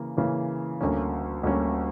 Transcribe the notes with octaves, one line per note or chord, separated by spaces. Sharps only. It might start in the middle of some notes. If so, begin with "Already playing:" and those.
Already playing: C#3 E3 A#3
C#3 E3 A#3
D2 D3 G3 A#3 C#4
D2 D3 G3 A#3 C#4